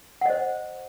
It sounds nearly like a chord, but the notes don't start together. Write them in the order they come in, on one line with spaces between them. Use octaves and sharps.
F#5 D#5 C5